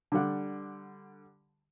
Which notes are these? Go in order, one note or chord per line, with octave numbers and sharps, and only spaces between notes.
D3 G3 F#5